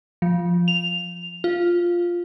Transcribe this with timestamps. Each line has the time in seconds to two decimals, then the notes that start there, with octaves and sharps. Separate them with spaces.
0.22 F3
0.68 F7
1.44 F4